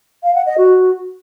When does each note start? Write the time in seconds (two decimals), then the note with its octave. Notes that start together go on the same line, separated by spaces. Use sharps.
0.23 F5
0.35 F#5
0.46 D#5
0.58 F#4